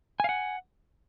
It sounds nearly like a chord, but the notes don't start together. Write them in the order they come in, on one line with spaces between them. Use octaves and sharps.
G#5 F5 F#5